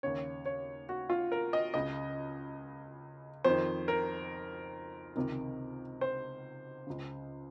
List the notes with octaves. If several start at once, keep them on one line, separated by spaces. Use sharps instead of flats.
D#2 C#3 C#5
C#5
F#4
F4
A#4
D#5
C#2 C#3 D#5
F2 D#3 C5
A#4
C#2 C3 D#3
C5
C#2 C#3